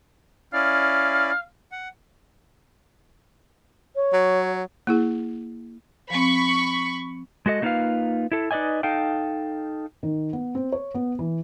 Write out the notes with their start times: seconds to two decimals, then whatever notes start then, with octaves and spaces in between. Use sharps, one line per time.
0.53 C#4 E4 D5 F5
1.72 F#5
3.96 C#5
4.13 F#3
4.87 A#3 E4 G#4
6.10 F3 C4 B5 C#6
7.46 G#3 F#4 A4 D#5
7.62 A3 A#3 D#4 F4 B4 F5
8.32 E4 A4
8.51 D#4 B4 D5 D#5 G#5
8.83 D#4 A4 F5 G5
10.03 D#3
10.33 B3
10.55 C4
10.72 C#5
10.94 B3
11.19 E3